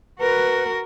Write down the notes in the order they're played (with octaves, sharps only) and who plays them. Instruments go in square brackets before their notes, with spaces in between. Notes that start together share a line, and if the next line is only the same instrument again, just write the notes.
[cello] F#4 A#4 [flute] B4